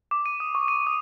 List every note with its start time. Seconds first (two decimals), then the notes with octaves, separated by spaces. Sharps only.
0.11 D6
0.26 D#7
0.40 D#6
0.55 C#6
0.68 D#7
0.87 D#6